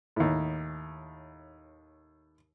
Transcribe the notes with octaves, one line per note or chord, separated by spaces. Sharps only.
D#2 A2